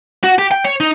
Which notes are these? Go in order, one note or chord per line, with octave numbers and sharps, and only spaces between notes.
F#4
G4
G5
C#5
D#4